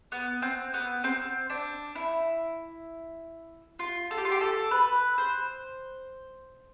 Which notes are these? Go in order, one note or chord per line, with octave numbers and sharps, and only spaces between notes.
B3
C4
B3
C4
D4
E4
F4
A4
G4
F4
G4
A4
B4
C5